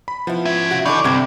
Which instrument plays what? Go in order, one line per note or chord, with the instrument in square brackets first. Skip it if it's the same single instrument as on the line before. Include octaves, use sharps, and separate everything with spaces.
[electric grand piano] B5
[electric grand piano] F3 [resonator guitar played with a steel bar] B3 E4
[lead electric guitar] C#4 E5 [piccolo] G#6
[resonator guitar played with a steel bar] C#3 F#4
[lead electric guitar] E3 [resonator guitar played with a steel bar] D4 D#4 A4 [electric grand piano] C#6 G6 [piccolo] D6
[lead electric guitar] C2 [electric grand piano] G2 G#6 [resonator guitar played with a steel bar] D3 C4